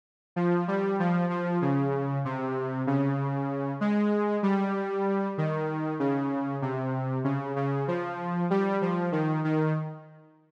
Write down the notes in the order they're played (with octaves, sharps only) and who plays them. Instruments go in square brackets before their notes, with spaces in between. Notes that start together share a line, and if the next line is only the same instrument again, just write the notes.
[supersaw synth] F3
G3
F3
F3
C#3
C3
C#3
G#3
G3
D#3
C#3
C3
C#3
C#3
F3
G3
F3
D#3
D#3